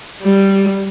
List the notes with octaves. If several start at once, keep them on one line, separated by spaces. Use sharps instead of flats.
G3